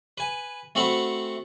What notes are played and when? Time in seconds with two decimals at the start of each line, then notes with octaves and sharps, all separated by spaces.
0.18 B4 G#5
0.75 A3 C4 F#4 F#5 B5